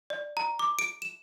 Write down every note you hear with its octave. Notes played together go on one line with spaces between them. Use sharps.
D5
A#5
D6
D7
E7